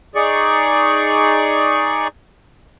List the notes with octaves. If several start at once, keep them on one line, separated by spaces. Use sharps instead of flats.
D#4 G#4 D5 C#6